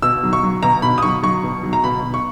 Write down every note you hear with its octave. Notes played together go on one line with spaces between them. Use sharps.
B2 E6
F#3
C#6
F#3
B2 A#5
B2 B5
D#6
F#3 C#6
F#3 C#6
B2
F#3
A#5
B2 B5
B2
C#6